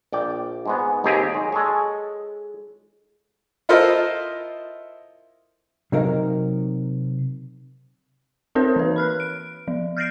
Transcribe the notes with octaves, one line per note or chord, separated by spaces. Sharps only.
A#1 D5 G5
G#2 G#3 B3
G#1 D#2 C4 G4 G#4 A#5
F#3 G#3
G#3 A4 C#5
E4 F4 A4 A#4 C5 D#5
C3 F#3 D#4 A#4 F5
C4 D#4 F#4 A#4 C#5
E3 B4
B5 F6 F#6
D7
F3
F6 G6 A6 A#6 C7 D7